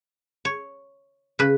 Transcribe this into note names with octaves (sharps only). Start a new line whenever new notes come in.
C#5
C#3 B4